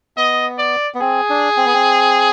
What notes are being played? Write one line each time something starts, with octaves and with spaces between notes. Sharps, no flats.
B3 D#5
D5
B3
C4 G#4
D4
C4
B3
C4